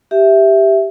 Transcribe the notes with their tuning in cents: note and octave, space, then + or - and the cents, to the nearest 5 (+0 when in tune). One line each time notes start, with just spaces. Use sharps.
G4 +0 E5 +0